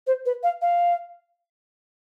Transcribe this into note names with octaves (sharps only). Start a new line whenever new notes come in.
C5
B4
F5
F5